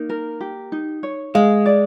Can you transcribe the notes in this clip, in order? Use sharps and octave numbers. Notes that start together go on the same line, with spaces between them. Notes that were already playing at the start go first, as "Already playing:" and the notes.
Already playing: A#3 D#4
A#4
G4
D#4
C#5
G#3 F5
D5